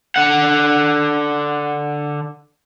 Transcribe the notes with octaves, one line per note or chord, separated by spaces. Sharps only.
D3 F#5